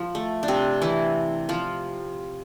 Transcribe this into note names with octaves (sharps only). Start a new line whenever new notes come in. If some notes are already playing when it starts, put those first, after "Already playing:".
Already playing: F3
A3
D4
C3 C4
E3 E4
F3 F4